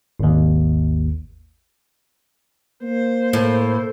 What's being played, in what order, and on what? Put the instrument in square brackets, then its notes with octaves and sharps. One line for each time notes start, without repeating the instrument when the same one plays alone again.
[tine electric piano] G#1 D#2
[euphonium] A#3 [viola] C5
[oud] A2